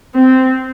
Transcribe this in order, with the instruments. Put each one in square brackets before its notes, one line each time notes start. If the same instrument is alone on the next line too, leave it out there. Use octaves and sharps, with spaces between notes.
[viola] C4